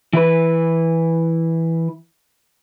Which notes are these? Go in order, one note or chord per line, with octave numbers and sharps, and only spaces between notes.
E3 E4 B4